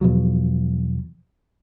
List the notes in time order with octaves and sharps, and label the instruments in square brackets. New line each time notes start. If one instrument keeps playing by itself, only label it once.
[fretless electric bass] E2 B2 F3 F#3